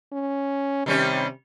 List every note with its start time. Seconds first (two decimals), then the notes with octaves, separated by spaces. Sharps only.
0.12 C#4
0.86 C3 D#3 G3 C#4